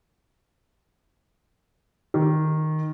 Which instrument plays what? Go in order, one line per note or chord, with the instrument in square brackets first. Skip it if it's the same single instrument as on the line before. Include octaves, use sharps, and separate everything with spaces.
[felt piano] D#3